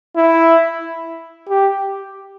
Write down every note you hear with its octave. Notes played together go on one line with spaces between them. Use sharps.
E4
G4